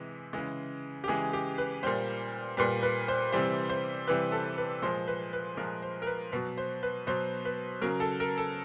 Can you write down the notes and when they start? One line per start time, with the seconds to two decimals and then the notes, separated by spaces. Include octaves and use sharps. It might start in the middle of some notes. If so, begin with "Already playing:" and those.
Already playing: C3 E3 G#3
0.33 C#3 E3 G#3
1.04 G4
1.08 C#3 E3 G#3 G#4
1.33 G4
1.58 B4
1.83 A#2 G3 C5
2.57 A#2 G3 B4
2.83 B4
3.08 C5
3.32 C3 E3 G3 C5
3.70 C5
4.07 C3 E3 G3 B4
4.32 A4
4.58 B4
4.82 A#2 F3 G#3 C5
5.08 B4
5.33 B4
5.57 A#2 F3 G#3 A#4
5.82 C5
6.02 A#4
6.07 B4
6.32 B2 F#3 B4
6.58 C5
6.83 B4
7.07 B2 F#3 C5
7.45 B4
7.81 C#3 F#3 A#4
8.00 A4
8.20 A#4
8.38 A4